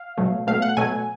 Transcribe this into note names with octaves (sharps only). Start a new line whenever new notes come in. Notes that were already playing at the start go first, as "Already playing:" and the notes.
Already playing: F5
B2 F#3 A3
B2 F#3 A3 F5
F#5
B2 F#3 A3 G#5